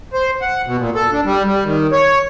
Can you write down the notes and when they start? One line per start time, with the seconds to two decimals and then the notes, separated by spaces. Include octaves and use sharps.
0.13 C5
0.42 F#5
0.66 B2
0.79 A#2
0.95 A4
1.12 D4
1.25 G3
1.46 G3
1.65 D#3
1.92 C#5